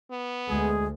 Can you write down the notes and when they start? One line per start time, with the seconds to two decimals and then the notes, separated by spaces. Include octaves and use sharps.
0.11 B3
0.49 D2 G#3 G#4